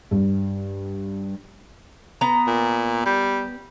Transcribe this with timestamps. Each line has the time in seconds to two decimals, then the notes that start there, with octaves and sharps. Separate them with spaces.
0.11 G2
2.21 B3 A#5
2.47 A#2
3.06 G3